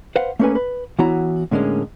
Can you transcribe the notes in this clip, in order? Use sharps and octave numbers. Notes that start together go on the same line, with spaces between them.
B4 C5 F5 F#5
A3 A#3 C#4 A4 B4 G#5
B4
E3 B3 E4 F#4 C#5 A#5
A2 D3 G#3 A#3 C#4